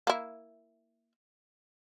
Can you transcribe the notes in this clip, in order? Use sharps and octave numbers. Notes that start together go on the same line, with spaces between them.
A#3 E4